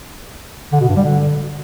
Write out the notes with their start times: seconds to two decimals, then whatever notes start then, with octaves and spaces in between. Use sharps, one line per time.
0.72 D3
0.80 B2
0.88 G2
0.96 G3
1.04 D3